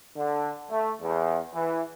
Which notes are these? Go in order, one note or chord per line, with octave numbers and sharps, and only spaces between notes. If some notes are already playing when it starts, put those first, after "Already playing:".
D3
A3
E2
E3